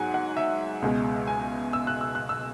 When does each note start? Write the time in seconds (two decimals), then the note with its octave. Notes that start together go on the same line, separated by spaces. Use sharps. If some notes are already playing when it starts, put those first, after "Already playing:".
Already playing: G#2 F#3 F#5 G#5
0.14 F#5
0.37 E5
0.82 C#2 B2 G#3
1.27 G#5
1.73 E6
1.87 F#6
2.01 E6
2.15 F#6
2.29 E6